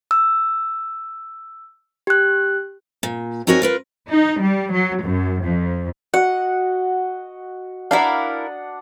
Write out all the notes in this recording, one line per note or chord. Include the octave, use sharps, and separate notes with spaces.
E6
G4 F#6
A#2
C4 D#4 F#4 A#4 C#5 G#5
F4 A#4 B4
D#4
G3
F#3
F#2
F2
F#4 D#5 F#5
D4 E4 A#4 F5 F#5 D#6